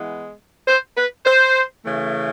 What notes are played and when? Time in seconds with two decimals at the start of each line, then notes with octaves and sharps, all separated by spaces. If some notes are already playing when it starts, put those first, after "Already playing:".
Already playing: E3 G#3 B3
0.67 C5
0.97 B4
1.26 C5
1.85 C#3 E3 A3